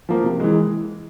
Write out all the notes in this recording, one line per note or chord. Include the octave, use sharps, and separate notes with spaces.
F3 A#3
C3
E3 G#3